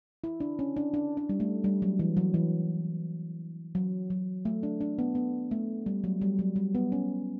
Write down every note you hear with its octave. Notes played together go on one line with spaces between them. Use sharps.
E4
D4
C#4
D4
D4
D4
G3
A3
G3
F#3
E3
F#3
E3
F#3
F#3
A3
D4
D4
B3
B3
A3
G3
F#3
G3
F#3
G3
B3
C#4